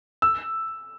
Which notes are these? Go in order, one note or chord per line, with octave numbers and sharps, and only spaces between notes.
E6